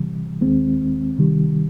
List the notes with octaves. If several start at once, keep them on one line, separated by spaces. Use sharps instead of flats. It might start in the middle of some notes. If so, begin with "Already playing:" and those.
Already playing: C3 E3 G3
D#2 D#3 G#3 C4
C3 D#3 G3